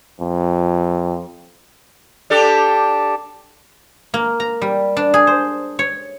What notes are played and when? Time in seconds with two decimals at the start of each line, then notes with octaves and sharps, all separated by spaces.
0.20 F2
2.30 D4 G4 A4
4.14 A#3
4.40 A#5
4.62 G3
4.97 D4
5.14 G#4
5.27 C5
5.79 C#5